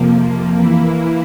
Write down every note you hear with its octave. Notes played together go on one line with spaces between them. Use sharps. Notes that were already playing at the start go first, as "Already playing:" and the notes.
Already playing: F2 C3 F3 A#3
E3 A#3 E4